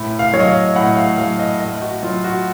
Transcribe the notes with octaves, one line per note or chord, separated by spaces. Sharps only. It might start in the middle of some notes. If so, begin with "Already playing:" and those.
Already playing: A2
F5
F#3 C#5
D#5
F5
A2 F#5
F5
F#3 F5
D#5
A2 D#5
F#4
F#3 F4
F#4